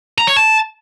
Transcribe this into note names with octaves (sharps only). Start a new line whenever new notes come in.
A#5
C#5
A5